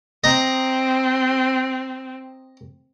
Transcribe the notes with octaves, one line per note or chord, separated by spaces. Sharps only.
C4 D#5 A#5